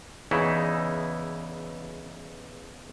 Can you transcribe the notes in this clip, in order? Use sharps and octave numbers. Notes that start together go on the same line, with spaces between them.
E2 C#3 E3 D#4 E4